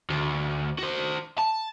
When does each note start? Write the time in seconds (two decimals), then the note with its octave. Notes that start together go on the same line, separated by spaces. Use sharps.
0.10 D2
0.79 F#4 C5
1.39 A5